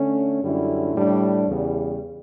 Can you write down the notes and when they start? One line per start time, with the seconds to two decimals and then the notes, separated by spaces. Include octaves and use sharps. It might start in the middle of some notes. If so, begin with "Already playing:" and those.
Already playing: D3 A3 C#4
0.42 F#2 D3 G3 C#4 E4
0.94 A2 G3 D4
1.48 E2 C#3 G3